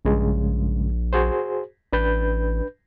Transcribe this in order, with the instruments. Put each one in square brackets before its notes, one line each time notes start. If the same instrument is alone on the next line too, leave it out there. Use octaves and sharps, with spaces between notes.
[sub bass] A#1 [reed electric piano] G2 C#3 G#3
[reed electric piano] F#4 G#4 C5
[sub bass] A1 [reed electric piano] D4 B4 G6